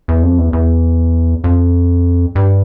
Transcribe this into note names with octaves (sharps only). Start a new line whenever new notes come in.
E2
F2
E2
E2
F2
G2